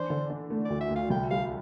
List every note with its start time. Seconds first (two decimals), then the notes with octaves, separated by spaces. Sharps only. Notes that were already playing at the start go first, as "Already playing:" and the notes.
Already playing: E3 D4 C5
0.10 D3
0.30 D4
0.50 A3
0.65 D5
0.70 D2
0.81 E5
0.91 D2
0.96 F5
1.10 C2 G5
1.30 G3 F5